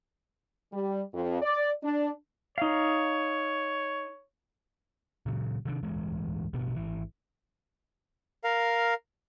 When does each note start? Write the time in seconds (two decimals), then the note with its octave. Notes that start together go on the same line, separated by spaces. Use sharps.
0.72 G3
1.13 F2
1.41 D5
1.82 D4
2.58 D#4 C#5 F5
5.26 A#2 C#3 F#3
5.65 C3 D#3 A3 D4
5.83 D1 G2 E3 G#3
6.53 A1 G2 B2 B3
6.76 G#1 E3
8.44 A#4 F5